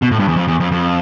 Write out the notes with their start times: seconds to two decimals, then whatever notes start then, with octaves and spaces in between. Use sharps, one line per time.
0.02 B2
0.11 A2
0.19 G2
0.28 E2
0.36 F2
0.48 E2
0.60 F2
0.72 F2